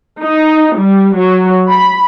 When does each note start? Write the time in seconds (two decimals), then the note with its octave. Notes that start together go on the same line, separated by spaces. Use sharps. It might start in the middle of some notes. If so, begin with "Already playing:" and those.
0.22 D#4
0.78 G3
1.18 F#3
1.70 B5